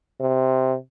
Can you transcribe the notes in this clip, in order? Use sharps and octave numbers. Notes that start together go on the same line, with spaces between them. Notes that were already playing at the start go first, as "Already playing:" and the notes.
C3